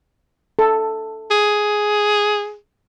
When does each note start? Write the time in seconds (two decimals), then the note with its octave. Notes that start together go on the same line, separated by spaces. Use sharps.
0.59 A4
1.31 G#4